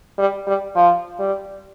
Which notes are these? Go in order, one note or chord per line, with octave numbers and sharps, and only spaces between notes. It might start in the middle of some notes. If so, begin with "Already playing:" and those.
G3
G3
F3
G3